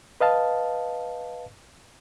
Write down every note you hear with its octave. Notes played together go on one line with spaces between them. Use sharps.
B4 D#5 F5 A5